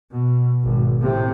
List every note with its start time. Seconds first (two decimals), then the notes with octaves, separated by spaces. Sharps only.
0.12 B2
0.63 G#1 B2
0.99 A2 C3